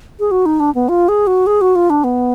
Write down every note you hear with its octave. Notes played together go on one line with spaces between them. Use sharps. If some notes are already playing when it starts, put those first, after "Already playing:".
G#4
F#4
D#4
D4
B3
F4
G#4
F#4
G#4
F#4
F4
D4
B3